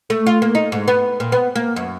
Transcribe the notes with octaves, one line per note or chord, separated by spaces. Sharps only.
A3
F4
A#3
D#4
G#2
B3
A#2
B3
A#3
F#2